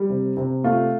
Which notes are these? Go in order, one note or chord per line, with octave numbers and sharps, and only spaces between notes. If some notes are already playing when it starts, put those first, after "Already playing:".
Already playing: G3
C3
C3
A3 F4